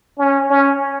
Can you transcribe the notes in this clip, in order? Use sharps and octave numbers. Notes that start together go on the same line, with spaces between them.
C#4
C#4